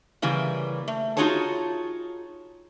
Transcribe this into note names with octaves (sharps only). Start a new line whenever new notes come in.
C#3 E3 G3 A#3
A3
D#4 F4 F#4 G#4 C#5 A5